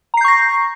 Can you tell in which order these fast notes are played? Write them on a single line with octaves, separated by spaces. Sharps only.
A#5 C7 G6 C#6 A#6